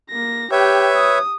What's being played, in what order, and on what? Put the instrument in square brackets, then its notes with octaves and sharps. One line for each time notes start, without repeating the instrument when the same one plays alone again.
[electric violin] A#3 A#6
[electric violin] G4 G5 [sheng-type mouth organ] B4 C#5 E5
[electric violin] D#6